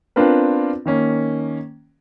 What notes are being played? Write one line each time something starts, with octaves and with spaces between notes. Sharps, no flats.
B3 C4 D4 F4 A#4 B4
D#3 A#3 C#4